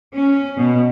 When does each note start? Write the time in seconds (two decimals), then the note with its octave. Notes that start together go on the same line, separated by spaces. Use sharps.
0.14 C#4
0.58 B2